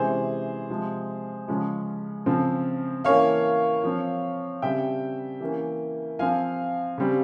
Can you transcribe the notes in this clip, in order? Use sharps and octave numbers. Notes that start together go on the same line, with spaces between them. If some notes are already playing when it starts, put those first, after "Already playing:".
Already playing: C3 E3 G#3 C#4 G#4 C5
C3 F3 G#3
C#3 F3 G#3 C#4
C#3 F3 C4
E3 A#3 C#4 C#5 F5
F3 C4
C#3 G3 C4 E5 G5
E3 A#3 C#4
F3 C4 F5 G#5
C#3 G3 C4